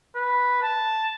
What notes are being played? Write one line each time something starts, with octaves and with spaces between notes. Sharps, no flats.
B4
A5